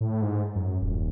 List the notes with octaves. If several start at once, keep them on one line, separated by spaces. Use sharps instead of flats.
A2
G#2
F#2
D#1